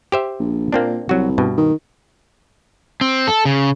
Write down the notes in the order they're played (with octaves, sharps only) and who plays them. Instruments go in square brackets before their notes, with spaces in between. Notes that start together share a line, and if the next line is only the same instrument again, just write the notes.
[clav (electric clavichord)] G4 C5 E5
[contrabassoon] A#1
[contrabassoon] A#2 [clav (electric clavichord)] A#3 C4 D4
[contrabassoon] C2 [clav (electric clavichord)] F#3 F#4
[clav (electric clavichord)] G2 B2
[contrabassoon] D#3
[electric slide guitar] C4
A4
C#3